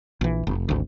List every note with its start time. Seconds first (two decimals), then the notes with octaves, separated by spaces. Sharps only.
0.21 A#1 E3
0.47 F1
0.69 G#1 D2